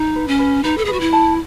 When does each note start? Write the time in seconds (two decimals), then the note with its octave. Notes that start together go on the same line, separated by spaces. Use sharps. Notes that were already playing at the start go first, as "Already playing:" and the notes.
Already playing: D#4
0.16 B4
0.28 C#4
0.39 B4
0.64 D#4 B4
0.78 A4
0.85 G#4
0.88 F#4 B4
1.01 E4
1.13 A5